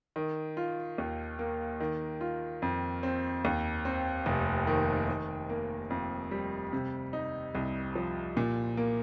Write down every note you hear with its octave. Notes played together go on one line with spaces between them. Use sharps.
D#3
F4
D#2
A#3
D#3
F4
F2
C4
D#2
C4
F1
D#3
D#3
A#3
F2
G3
C3
D#4
C2
F3
A#2
A#3